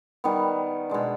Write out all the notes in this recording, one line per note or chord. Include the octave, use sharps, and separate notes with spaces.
D#3 G3 B3
B2 G#3 D4